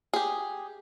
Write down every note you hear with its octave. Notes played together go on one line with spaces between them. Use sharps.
G4 G#4